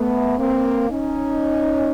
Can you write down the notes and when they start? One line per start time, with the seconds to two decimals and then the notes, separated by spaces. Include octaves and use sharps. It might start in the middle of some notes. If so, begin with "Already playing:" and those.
Already playing: A3 B3
0.38 A#3 C4
0.90 C#4 D#4